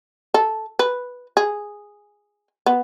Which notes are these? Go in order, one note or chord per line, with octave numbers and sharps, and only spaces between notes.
A4
B4
G#4
B3